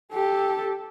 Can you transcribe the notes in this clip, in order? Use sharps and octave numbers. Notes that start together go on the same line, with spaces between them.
G4 A4